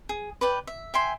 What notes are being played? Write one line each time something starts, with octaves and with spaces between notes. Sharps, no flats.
G#4
B4 D5 G5
E5
E5 G5 G#5 C6